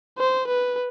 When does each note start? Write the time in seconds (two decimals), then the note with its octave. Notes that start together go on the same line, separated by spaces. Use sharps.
0.18 C5
0.48 B4